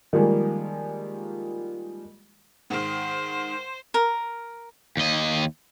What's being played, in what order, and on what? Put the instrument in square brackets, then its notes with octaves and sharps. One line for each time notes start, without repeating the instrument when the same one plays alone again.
[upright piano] D#3 F3 G3 G#3 A#3
[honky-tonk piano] G#2 D#3 [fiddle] C5
[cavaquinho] A#4
[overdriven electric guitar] D#2 D#5